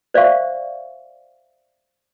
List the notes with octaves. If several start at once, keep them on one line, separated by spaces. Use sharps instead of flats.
C5 D5 E5 F5 C#6